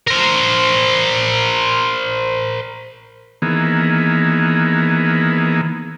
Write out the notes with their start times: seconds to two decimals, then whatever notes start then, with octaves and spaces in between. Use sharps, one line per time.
0.07 A#4 C5
3.42 D#3 E3 A#3 B3 G#4